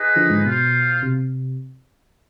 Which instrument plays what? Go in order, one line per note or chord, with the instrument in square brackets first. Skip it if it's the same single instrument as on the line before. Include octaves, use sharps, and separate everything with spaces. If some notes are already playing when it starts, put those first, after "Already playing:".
Already playing: [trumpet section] D#4 G#4 B4 D#5
[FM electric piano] D3 F3
G#2
[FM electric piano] B2 [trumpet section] F4 C5 F5
[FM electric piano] C3